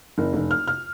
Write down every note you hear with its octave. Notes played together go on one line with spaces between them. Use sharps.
F#1
F1
F6
F6